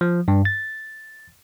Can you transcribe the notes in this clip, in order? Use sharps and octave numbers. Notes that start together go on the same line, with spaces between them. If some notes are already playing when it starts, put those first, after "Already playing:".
F3
G2
A6